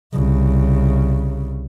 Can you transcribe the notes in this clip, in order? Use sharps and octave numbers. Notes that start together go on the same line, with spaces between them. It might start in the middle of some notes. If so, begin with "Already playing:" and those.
C2 C#3